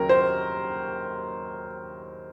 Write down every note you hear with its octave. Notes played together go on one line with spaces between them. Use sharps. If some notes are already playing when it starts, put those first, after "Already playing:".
Already playing: D#2 C#3 F#3 A#4
C5